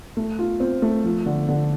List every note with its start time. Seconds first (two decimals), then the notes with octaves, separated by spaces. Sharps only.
0.17 A3
0.39 F4
0.60 C4
0.82 A3
1.04 F3
1.26 D3
1.49 D3